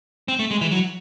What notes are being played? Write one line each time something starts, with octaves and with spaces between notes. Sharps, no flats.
C4
A3
G#3
E3
F#3